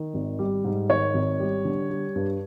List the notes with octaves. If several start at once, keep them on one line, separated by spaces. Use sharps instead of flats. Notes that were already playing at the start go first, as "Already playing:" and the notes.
Already playing: D#3
G#1
G3
G#2
D#3 C#5
G#1
G3
D3
G3
G2